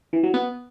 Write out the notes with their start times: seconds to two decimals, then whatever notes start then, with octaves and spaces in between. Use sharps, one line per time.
0.13 E3
0.23 F#3
0.34 B3